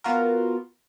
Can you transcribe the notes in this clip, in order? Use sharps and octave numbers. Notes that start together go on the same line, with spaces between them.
B3 F4 F#4 A#4